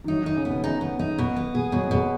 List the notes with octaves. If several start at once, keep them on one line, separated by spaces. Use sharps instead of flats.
D#3
F#3 D#4
D#3
D#4
C#3
B2 B3
C#3 D#4
B3
D#4
B2
B3
G#4
B2 F#3
B3
B2 G#3